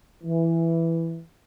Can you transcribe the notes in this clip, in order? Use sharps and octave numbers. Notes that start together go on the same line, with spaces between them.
E3